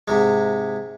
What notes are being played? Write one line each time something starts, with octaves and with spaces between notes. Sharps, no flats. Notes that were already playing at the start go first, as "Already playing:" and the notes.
G#2 C3 G#3